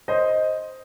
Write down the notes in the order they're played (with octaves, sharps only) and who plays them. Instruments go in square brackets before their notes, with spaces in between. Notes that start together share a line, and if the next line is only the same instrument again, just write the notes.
[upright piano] C5 D#5